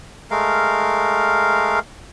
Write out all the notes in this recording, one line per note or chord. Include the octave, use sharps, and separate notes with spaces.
G#3 A3 A#4 F5